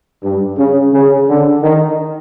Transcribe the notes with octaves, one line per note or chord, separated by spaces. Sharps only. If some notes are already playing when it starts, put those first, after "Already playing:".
G2
C#3
C#3
D3
D#3